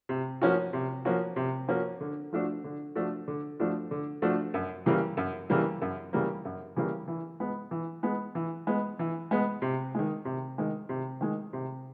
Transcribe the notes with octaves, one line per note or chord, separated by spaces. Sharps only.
C3
F3 A#3 C#4 F#4
C3
F3 A#3 C#4 F#4
C3
F3 A#3 C#4 F#4
D3
F3 A3 D4 F#4
D3
F3 A3 D4 F#4
D3
F3 A3 D4 F#4
D3
F3 A3 D4 F#4
F#2
C#3 E3 G3 A#3
F#2
C#3 E3 G3 A#3
F#2
C#3 E3 G3 A#3
F#2
C#3 E3 G3 A#3
E3
G#3 B3
E3
G#3 B3
E3
G#3 B3
E3
G#3 B3
C3
D#3 G#3
C3
D#3 G#3
C3
D#3 G#3
C3